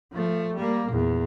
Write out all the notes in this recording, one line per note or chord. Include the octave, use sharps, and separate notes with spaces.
F3 A3
G3 A#3
E2 A#2